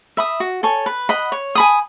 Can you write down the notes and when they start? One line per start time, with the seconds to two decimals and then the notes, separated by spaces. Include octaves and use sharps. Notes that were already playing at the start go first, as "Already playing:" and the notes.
0.17 E5 B5 D#6
0.40 F#4
0.63 A4 C#5 G#5
0.86 B4
1.09 D#5 F#5 B5
1.32 C#5
1.55 G#5 B5 D#6